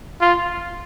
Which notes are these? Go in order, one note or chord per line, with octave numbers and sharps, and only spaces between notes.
F4